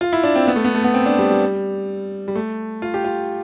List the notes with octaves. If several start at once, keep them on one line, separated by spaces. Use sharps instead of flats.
F4
E4
D4
C4
B3
A3
B3
A3
B3
C4
D4
G3
G3
G3
A3
F4
G4
F4